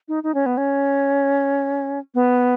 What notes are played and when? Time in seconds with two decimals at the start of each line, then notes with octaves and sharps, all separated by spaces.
0.08 D#4
0.23 D#4
0.34 C#4
0.46 B3
0.57 C#4
2.14 B3